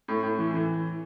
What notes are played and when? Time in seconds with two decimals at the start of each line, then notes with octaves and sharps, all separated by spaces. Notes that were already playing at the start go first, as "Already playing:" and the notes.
0.08 A2
0.23 A2
0.39 E3
0.54 E3